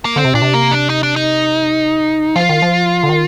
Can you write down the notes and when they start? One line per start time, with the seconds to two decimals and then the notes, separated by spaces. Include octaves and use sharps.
0.05 A#3
0.16 D3 C4
0.25 C3
0.34 A#2 D4
0.42 C3
0.54 A#3
0.71 D4
0.90 D#4
1.03 D4
1.16 D#4
2.36 F3 F4
2.49 D#3
2.62 F3
3.03 D3
3.09 D#3